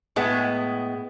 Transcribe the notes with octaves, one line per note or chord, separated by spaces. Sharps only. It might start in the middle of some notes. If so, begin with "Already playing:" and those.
A2 G#3 B3